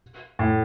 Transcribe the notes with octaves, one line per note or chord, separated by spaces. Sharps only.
A2